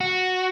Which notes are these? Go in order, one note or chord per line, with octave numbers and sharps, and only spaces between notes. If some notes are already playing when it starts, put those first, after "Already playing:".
F#4